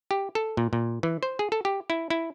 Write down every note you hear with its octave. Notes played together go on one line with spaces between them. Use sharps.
G4
A4
A#2
A#2
E3
C5
G#4
A4
G4
E4
E4